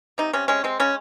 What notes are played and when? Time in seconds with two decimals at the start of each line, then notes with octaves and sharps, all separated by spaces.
0.18 C3 D#4
0.33 C3 C#4
0.48 G#3 C#4
0.64 G#3 C4
0.80 C#3 C#4